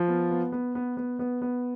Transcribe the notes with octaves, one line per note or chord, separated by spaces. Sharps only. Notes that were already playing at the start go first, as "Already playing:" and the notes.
Already playing: F3 F4
B3
B3
B3
B3
B3
B3
B3